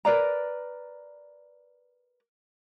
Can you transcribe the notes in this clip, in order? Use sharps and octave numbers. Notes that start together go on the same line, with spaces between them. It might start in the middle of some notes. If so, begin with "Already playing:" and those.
A#4 B4 D5 A#5